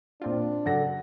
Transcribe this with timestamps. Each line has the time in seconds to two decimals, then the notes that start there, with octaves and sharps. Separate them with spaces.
0.22 A#2 C4 D4 F4
0.65 F#2 C#3 A4 F#5 A#6